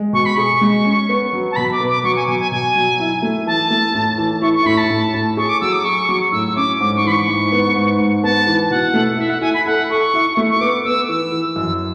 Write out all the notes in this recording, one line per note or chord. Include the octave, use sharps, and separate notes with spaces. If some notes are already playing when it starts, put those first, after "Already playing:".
Already playing: G#3
B2 C#6
B5
G#4 C#6
G#3
C#4
B3
F#3
A5
B2 B5
D6
B3
D6
F#3 C#6
G#5
B2 G#5
G#5
B2 G#5
F#3
E4
A3
E3 A5
A3
A2
E3
E4 C#6
C#6
A2 B5
A5
A2
A2
G#4 C#6
D6
F#3 E6
D6
G#4 C#6
F#3
A2 E6
E6
C#4 D6
G#2 D6
C#6
E3 B5
C#6
G#2
B3
G#2
G#2
B3 A5
E3
B2 F#5
A3
E4 E5
F#5
E4 G#5
B5
A4 F#5
A4 C#6
E4
A3
C#6
B3 D6
B3 E6
E3 E6
E3
F#2 E6